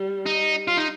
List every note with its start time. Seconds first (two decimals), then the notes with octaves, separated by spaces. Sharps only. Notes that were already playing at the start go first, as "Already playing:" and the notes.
Already playing: G3
0.26 D#4
0.68 F4
0.77 D#4